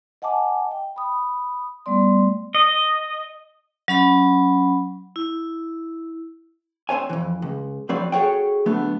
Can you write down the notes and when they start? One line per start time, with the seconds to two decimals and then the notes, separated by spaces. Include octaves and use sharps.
0.22 D#5 F#5 G#5 A5 D6
0.71 G5
0.96 B5 D#6
1.86 G3 A3 B3 D5 C6
2.55 D#5
3.88 F#3 C#4 B5
5.16 E4
6.89 C4 C5 C#5 G#5
7.09 F2 E3
7.42 C#2
7.89 F3 F#3 C4 B4 C#5 D5
8.12 F#4 G#4 A4 C#5 F#5 G5
8.66 D3 F#3 A3 B3